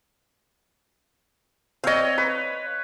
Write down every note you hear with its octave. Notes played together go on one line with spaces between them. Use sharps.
C4 C#5 D#5 F5
B4